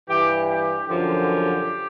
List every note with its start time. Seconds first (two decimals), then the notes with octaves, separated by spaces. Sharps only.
0.08 G2 E3 G4
0.48 G4
0.88 F#2 D3 F3 G4